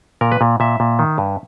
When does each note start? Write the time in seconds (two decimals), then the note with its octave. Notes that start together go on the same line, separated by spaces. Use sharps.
0.21 A#2 A#4
0.32 B4
0.41 A#2
0.60 A#2 E5
0.80 A#2
0.99 D#3
1.18 G2